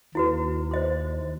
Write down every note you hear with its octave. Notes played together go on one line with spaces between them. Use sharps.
D#2 E4 F#4 B4
C5 D#5 C6